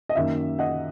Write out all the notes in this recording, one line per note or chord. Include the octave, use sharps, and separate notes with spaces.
D#5
F#2 D#3 A#3 E5
D#5 F#5